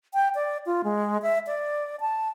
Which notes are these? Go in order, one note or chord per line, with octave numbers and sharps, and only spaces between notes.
G5
D5
F4
G#3
E5
D5
A5